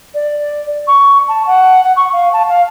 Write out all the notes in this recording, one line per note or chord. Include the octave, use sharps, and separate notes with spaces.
D5
C#6
A5
F#5
F#5
C#6
F5
A5
F5